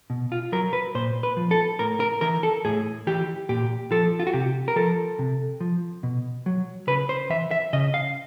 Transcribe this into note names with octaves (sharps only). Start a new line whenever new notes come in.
B2
F4
F#3 A#4
B4
A#2 C5
B4
F3
A4
A2 A#4
A#4
E3 A#4
A4
A2 G#4
E3 G4
A#2 G4
F3 A4
F4
F#4
C3 G4
A#4
F3 A4
C3
F3
B2
F#3
C#3 B4
C5
E3 E5
E5
C#3 D#5
F5